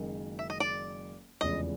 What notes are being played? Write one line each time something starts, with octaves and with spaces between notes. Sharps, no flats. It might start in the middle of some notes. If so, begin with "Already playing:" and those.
Already playing: F#1 F#2 D#3 G#3
E5
D#5
D5
F1 E2 C#3 F3 G#3 D#5